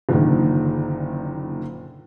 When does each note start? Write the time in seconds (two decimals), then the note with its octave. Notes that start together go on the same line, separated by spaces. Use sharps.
0.09 F#1 A#2 D3 D#3